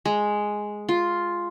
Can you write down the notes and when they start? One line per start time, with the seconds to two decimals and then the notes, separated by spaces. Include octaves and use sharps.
0.06 G#3
0.89 F4